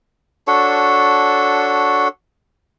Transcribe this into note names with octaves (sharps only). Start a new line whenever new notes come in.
D4 F#4 A4 C#5